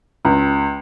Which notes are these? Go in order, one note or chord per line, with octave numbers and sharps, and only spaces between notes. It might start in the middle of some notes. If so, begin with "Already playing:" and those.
C#2